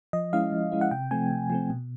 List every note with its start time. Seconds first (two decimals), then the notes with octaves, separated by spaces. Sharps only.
0.13 F3 D#5
0.33 G#3 C#4 E4 F5
0.52 F3
0.72 G#3 C#4 E4
0.81 F#5
0.91 C3 G5
1.11 F3 A3 C4 G#5
1.31 C3
1.50 F3 A3 C4
1.70 B2